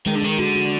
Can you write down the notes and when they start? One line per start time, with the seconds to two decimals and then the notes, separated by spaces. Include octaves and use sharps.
0.06 D#3 G#3
0.15 D3
0.22 D#3 G#3
0.39 D3 F#4
0.55 F#4